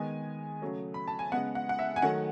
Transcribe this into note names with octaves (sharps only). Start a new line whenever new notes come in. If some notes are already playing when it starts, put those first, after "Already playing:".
Already playing: D#3 G#3 B3 G#5
C#3 F#3 A3
B5
A5
G#5
C#3 G#3 B3 F#5
F#5
F#5
E5
G#5
D#3 F#3 A3 F#5